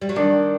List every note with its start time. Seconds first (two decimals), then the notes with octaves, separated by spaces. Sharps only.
0.01 G3
0.09 F#3
0.16 D#3 D4